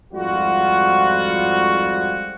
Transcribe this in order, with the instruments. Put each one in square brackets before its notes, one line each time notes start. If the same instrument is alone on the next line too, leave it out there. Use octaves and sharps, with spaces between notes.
[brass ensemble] F2 G#2 G3 F4 F#4